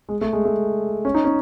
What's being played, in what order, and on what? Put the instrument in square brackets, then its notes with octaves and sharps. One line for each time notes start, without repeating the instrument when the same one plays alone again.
[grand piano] G#3
A3
G#3
A3
C#4
D#4
C#4